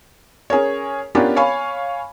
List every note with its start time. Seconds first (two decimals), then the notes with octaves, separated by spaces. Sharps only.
0.50 C#4 G#4 A#4 C#5
1.15 B3 C#4 D4 F4 G4 A#4
1.36 C#5 F5 G#5 B5 C#6